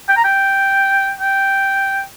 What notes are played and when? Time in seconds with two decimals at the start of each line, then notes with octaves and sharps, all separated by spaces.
0.09 G5
0.17 A#5
0.24 G5
1.21 G5